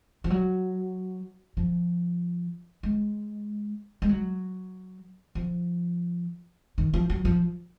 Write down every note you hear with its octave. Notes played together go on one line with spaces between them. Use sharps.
F3
F#3
F3
G#3
G#3
F#3
F3
D#3
F3
F#3
F3